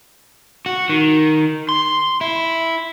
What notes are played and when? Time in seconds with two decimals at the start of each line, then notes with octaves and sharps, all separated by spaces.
0.66 F#4
0.89 D#3
1.69 C6
2.21 E4